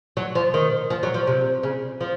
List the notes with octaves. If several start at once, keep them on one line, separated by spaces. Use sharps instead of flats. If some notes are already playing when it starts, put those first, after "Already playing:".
F#3
F3
D#3
F3
F#3
F3
C3
C#3
F3